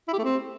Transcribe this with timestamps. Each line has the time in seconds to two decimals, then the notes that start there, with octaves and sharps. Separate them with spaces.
0.08 E4
0.13 G4
0.19 A3
0.24 C4